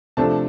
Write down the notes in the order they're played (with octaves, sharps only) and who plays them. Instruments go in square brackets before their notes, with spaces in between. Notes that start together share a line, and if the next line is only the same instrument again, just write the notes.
[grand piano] C3 F3 A3 D4 A5